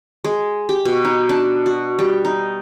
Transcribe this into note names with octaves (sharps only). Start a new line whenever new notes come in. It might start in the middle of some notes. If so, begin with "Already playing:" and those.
G#3
G4
B2
D#4
D4
F#4
G3
D#4